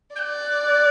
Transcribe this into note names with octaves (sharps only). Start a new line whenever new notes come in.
D5 F#6 G6